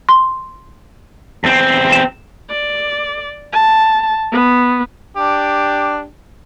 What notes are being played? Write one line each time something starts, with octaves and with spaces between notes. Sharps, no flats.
C6
E2 C4
E7
D5
A5
B3
D4 G4